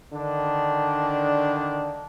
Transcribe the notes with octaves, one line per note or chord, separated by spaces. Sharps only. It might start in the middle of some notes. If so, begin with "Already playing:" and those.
D3 D#3 D4